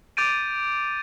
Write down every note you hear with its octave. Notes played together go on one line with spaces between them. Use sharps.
D6 G6 A6 D7 D#7